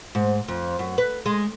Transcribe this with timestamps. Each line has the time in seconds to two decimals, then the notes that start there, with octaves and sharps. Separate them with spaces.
0.15 G#2
0.48 F2
0.79 F#2
0.98 B4
1.26 G#3